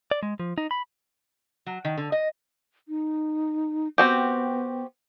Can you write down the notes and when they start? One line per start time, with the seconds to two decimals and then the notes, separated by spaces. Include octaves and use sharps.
0.11 D5
0.23 G#3
0.40 F3
0.58 D#4
0.71 B5
1.66 F#3
1.85 D#3
1.98 D3
2.12 D#5
2.89 D#4
3.98 B3 C4 F#4 G4